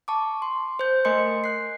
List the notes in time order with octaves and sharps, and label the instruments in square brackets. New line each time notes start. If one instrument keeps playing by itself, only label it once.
[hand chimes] A5 C#6 D6
C6
C5 G6
A3 A#4 D#5 G#5 C6 C#7
F#6 C7